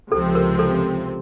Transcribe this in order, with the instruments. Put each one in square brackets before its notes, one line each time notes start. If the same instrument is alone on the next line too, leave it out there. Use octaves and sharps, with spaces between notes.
[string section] C#2 C3 F3 C4 [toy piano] A4
[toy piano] A#4
A4